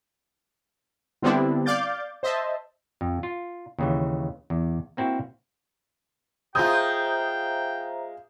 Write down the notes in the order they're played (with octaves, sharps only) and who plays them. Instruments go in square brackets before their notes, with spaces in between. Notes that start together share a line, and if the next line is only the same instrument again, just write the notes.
[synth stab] D3 G3 B3 C4 D4 E4
D5 F5 D6 G6 A6
C5 D#5 E5 A5
[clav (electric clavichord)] F2
F4
D#2 C#3 E3
E2
A#3 C4 E4 F#4
[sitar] G#3 F4 [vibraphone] C5 E5 A#5 [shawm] G5 [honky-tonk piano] D#6 G6